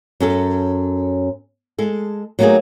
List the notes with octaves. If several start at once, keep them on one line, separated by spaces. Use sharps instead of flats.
F#2 C#4 A4
G#3 A4
F#3 A3 A#3 C#4 D#4 G#4